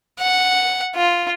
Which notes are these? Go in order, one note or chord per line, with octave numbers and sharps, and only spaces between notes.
F#5
F4